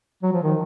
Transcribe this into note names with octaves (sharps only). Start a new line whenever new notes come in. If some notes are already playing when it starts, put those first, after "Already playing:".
F#3
F3
D#3